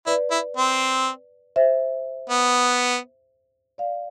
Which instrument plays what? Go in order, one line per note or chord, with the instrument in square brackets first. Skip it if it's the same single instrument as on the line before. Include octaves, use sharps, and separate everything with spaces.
[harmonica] E4 [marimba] B4 D5
[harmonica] E4
C4
[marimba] C5 E5
[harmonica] B3
[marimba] D5 F5